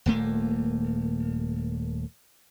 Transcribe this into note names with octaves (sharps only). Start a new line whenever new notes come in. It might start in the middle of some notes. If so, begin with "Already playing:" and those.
D#1 A#2 A3 A#3